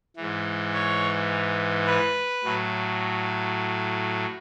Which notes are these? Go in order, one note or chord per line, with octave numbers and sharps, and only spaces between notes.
G#2 E3
C#5
B4
A2 F#3